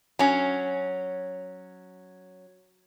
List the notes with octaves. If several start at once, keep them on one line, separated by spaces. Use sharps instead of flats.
F#3 C#4